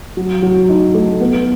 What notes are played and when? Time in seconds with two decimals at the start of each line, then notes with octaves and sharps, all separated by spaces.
0.17 F#3
0.42 F#3
0.69 D#4
0.94 A3
1.20 B3